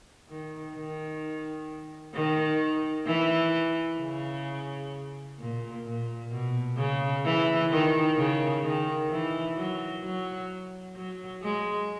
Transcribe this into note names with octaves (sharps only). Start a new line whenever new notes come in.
D#3
D#3
D#3
E3
C#3
A#2
A#2
B2
C#3
E3
D#3
C#3
D#3
E3
F#3
F#3
F#3
G#3